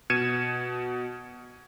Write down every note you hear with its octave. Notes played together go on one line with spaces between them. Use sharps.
B2 G#6 C#7 D#7 E7